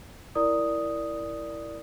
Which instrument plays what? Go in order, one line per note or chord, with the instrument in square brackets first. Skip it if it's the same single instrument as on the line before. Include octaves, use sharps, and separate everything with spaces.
[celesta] E4 A#4 D5 D#6